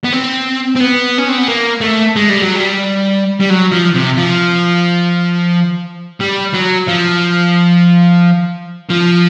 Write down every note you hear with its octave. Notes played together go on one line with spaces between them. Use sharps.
B3
C4
C4
B3
C#4
C4
B3
A#3
A3
G#3
G3
F#3
G3
G3
F#3
F3
C3
F3
G3
F#3
F3
F3